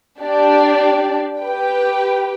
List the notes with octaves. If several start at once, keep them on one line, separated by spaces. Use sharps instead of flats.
D4 G4 D5
G4 B4 G5